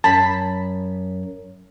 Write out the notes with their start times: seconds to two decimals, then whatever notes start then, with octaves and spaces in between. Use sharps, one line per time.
0.04 F#2 A5 B5 B6